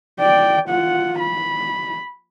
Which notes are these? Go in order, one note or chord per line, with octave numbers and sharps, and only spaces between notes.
D5 G5
F4 F#5
B5